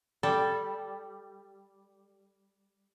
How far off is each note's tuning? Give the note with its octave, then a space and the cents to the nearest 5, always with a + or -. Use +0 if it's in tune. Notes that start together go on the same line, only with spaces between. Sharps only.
G3 +0 A4 +0